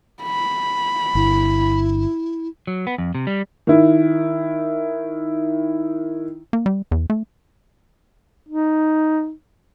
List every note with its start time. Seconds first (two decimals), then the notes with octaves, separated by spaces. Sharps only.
0.23 B5
1.15 G1 E4
2.67 F#3
2.87 B3
2.98 F2
3.15 C3
3.27 G3
3.67 D#3 E4
6.53 A#3
6.66 G3
6.91 E2
7.10 A3
8.49 D#4